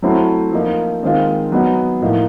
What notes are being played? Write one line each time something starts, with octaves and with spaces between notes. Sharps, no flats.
F#3 A3 C4 E4
F3 A#3 D#4
D#3 G#3 C4 F4
F#3 B3 D#4
A2 F3 A#3 D#4